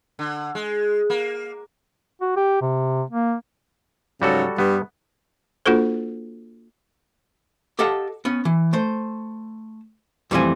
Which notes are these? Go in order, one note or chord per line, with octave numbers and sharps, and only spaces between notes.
D3
G#3
A#3
F#4
G4
C3
A#3
G#2 C#3 F#3 G3 F#4 A4
G2 G3 B3
A#3 D4 F4 F#4 A4 C5
G4 A4 D#5 F5 F#5 A5
B3 C#4
E3
A3 C5
F2 E3 G3 A3 C4 G#5